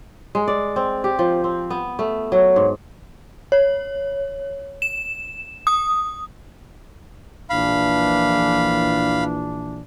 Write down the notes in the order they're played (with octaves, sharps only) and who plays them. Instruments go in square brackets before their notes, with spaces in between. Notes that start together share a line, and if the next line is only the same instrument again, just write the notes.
[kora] G#3
D5
C4
G4
F3
C4
B3
A3
F#3
G#2
[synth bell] C#5
E7
D#6
[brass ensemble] A#1 E3 D4 [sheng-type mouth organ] F5 B5